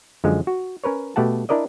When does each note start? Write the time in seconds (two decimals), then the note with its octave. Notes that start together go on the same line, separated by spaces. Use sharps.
0.24 F#2 D3 F3 G#3
0.47 F#4
0.84 C#4 A#4 B4 C#5
1.16 B2 A3 G4 F#5 A5
1.49 D4 E4 A#4 D5 D#5